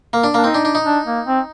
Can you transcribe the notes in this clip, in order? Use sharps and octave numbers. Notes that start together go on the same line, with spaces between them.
A#3
D4
A#3 D4
C4 D#4
D4
D4
D#4
D4
A#3
C4